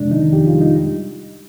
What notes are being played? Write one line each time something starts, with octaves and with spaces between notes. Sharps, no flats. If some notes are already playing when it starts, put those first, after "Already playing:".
Already playing: F2 C3 G#3 D4
D#3 D#4
F2 G4
F4
G3
D#4